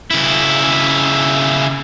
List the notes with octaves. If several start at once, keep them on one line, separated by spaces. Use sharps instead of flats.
C#3 E4